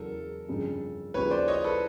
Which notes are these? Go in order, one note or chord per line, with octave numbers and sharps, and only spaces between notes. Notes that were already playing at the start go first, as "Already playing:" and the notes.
Already playing: E2 C#3 F#3 A4 A#4
G1 F2 C#3
D#2 C#3 F3 B4 C#5
C5 D5
C#5 D#5
A4 B4